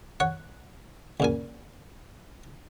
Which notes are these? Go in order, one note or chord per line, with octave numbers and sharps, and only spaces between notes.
C#5 F#5
C#2 A#2 G#5